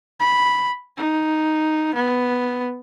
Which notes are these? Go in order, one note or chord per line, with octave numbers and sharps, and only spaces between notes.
B5
D#4
B3